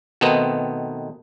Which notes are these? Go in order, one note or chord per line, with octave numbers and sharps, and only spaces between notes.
B2 D#3 A3 B3 C4 D#4